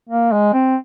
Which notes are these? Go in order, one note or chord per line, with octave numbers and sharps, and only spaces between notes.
A#3
G#3
C4